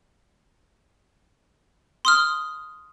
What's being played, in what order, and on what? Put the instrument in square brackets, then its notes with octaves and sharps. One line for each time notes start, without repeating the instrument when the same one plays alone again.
[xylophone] C6 D#6 F6